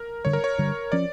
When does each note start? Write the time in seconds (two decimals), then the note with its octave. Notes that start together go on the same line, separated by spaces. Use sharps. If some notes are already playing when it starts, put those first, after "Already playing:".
Already playing: A#4
0.25 G2 D3 G3 C#5
0.33 A#4
0.44 C#5
0.58 G2 D3 G3
0.92 F3 C#4 D5